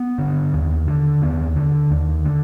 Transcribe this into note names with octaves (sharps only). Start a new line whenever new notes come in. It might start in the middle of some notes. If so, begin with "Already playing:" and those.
Already playing: B3
D3
D#2
D3
D#2 B3
D3
D#2
D3